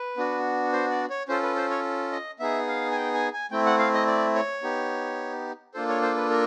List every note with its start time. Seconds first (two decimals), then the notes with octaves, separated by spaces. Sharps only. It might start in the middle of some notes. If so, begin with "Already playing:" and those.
Already playing: B4
0.17 B3 D4 F#4
0.73 C5
0.91 D5
1.10 C#5
1.28 C#4 F4 A4 C5
1.43 B4
1.56 C5
1.70 C#5
2.12 D#5
2.40 B3 D#4 G#4 E5
2.68 F5
2.92 G#5
2.96 G5
3.14 G#5
3.33 G#5
3.51 A3 C4 E4 G5
3.66 F#5
3.79 F5
3.94 D#5
4.07 D5
4.35 C#5
4.63 B3 D#4 G4
5.74 A#3 D4 F4 A4 C5
5.89 C#5
6.02 C5
6.17 B4
6.30 A#4